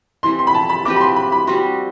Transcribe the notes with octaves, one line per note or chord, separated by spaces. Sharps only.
E3 G3 C4 C6
C6
B5
A5
B5
F#3 C4 G4 B4 D6
B5
C6
B5
B5
G3 C4 F#4 C6